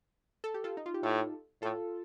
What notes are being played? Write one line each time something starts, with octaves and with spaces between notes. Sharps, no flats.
A4
G4
F4 A4
D#4
F4
G4
A2 F4 A4
A2 F4 A4